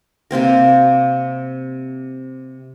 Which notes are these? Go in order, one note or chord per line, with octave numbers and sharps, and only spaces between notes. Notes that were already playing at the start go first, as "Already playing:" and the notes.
C3 A#3 C4 A#4